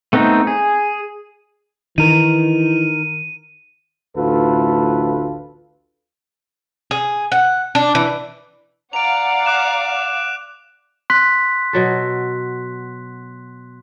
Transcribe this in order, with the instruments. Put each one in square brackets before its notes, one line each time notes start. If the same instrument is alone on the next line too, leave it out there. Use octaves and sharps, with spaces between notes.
[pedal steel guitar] A3 B3 C4 D#4
G#4
[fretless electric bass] D#3 [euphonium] E3 [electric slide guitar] D#4 A#4 [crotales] D#7
[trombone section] A1 D2 A2 F4 A4 B4
[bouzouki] G#4
F#5
D4
E3
[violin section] D5 F5 F#5 [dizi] A#5 [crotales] D7 F7
[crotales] D6 F#6 E7
[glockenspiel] C6 F#6 B6
[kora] B2 F#3 A4